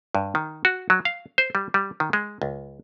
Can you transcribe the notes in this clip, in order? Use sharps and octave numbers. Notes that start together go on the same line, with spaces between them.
G2
D#3
F#4
F#3
F5
C5
G3
G3
D#3
G#3
C#2